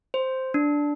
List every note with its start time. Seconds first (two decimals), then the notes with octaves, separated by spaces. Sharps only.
0.14 C5
0.54 D4